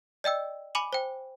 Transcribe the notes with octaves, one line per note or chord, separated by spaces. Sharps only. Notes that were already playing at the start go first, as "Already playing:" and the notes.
D5 D#5 G5 E6
G#5 B5 D6 D#7 F#7
C5 G5